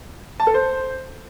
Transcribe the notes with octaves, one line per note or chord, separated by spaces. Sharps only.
A5
A4
C5